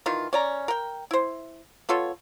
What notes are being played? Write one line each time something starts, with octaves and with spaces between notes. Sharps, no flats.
D#3 E3 F4
C#4 D5 A#5
A#4 G5
E4 C5
B3 F4 A4 C#5